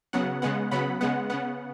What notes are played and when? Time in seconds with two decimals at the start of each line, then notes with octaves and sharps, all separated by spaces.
0.13 C#3 F#3 B3 F#5
0.42 C#3 G#3 B3 F#5
0.71 C#3 F#3 B3 F#5 B5
1.01 C#3 G#3 B3 F#5
1.30 C#3 B3 F#5